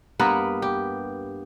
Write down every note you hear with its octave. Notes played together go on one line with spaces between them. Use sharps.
G2 A#3 B3 B4
G4